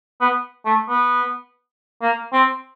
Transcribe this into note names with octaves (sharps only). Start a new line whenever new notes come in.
B3
A3
B3
A#3
C4